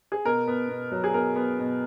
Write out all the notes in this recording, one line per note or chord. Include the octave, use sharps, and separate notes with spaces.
G#4
B2 A#4
B3
B2
F#3
G#4
B2 A#4
B3
B2